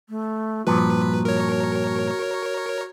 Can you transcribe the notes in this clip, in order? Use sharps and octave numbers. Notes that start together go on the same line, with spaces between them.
A3
G2 A#2 F3 F#4 B4
A#4 C#5